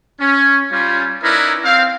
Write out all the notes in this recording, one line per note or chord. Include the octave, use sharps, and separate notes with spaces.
C#4
G3 C#4 F4
C#4 D#4 E4 A#4 B4 D5
C4 F5